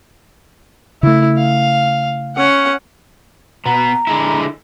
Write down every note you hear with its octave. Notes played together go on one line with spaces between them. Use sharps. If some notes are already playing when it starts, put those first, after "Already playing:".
C#3 A3 E4
F5
C#4 F#5
B2 B3 A#5
D3 G#3 E4